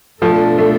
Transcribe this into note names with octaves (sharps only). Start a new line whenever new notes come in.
B2 F3 A3 B3 D4 A4
A3